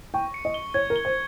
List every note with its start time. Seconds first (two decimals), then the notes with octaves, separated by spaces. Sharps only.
0.14 G5 C#6
0.34 C#7
0.45 D#5
0.54 G7
0.74 C#5 G#6
0.90 A#4
0.96 G7
1.05 C5